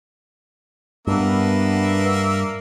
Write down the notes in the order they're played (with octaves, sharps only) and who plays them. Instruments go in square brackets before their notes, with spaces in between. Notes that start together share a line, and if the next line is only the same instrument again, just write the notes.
[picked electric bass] G2 [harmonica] A#3 E5 [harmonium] B3 D4 B4